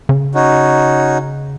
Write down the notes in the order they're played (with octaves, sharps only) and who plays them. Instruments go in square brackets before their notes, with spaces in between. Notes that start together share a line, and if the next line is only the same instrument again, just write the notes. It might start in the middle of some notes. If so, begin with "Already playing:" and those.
[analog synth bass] C#3
[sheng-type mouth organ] C#4 D#4 F#4